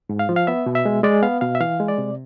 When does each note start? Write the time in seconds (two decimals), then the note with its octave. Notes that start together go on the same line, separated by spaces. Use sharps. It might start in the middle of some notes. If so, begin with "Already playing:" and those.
0.09 G#2
0.19 F5
0.29 F3
0.36 F5
0.47 B3 E5
0.66 B2
0.75 E5
0.85 G#3
1.03 G#3 D5
1.23 B3 F5
1.41 B2 F5
1.55 E5
1.60 E3 F5
1.80 G#3
1.88 D5
1.98 C3